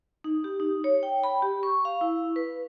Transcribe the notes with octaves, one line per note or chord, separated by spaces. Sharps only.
D#4
G4
D#4
C#5
G5
B5
G4
C#6
F5
E4
B4